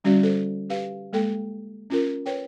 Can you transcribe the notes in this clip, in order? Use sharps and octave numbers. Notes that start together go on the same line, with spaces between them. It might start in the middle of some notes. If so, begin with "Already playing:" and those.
D3 G3 C#4 F#4 D5 F5
A4 C5
G4 B4 F5
G#3 A#3 A4 G5
C#4 F4 A#4
B4 C#5 G5